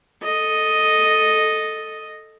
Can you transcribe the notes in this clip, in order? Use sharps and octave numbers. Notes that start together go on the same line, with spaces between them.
A4 D#5